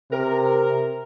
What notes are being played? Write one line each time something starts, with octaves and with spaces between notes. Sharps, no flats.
C3 A#4